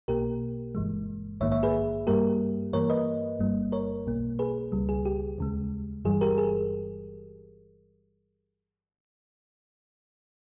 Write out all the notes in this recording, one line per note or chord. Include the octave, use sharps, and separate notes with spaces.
B1 B2 A#3 G4 A#4
G1 G2 E3 G#3
A#1 G#2 D#3 A#3 C#5 E5
C#5 E5
G#4 B4
G2 G3 A#3 G4 A#4
G2 E3 A#3 A#4 C#5
B4 D#5
G1 G2 G3 A#3
A#4 C#5
B1 B2 A#3
G#4 B4
C#2 C#3 G3
G#4
G4
D#2 C#3 G#3
G1 G2 E3 G3 G#4
G4 A#4
G#4